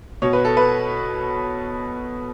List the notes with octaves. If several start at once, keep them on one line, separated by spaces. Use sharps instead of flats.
B2 C#5
B4
A4
B4